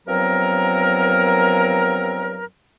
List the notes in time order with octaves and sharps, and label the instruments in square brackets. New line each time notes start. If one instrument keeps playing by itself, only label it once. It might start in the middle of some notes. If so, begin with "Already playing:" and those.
[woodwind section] G2 F3 F#3 B3 C4 A#4